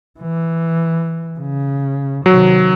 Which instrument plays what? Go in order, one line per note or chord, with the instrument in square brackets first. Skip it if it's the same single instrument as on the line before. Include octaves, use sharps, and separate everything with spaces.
[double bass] E3
C#3
[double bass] C3 D#3 [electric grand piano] F#3